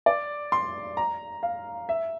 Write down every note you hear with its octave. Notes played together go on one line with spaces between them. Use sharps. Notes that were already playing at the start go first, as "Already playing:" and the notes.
D5
C6
A#5
F5
E5